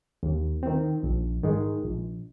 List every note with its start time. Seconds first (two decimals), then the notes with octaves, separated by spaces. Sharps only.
0.23 D#2
0.63 D#3 C4
1.03 A#1
1.43 G#2 D#3 G#3
1.84 A#1